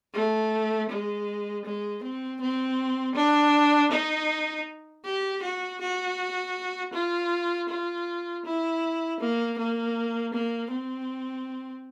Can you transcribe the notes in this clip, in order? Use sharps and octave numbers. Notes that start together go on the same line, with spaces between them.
A3
G#3
G#3
C4
C4
D4
D#4
G4
F#4
F#4
F4
F4
E4
A#3
A#3
A#3
C4